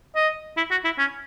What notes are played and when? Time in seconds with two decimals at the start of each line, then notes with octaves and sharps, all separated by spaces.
0.15 D#5
0.57 E4
0.71 F#4
0.84 E4
0.98 C#4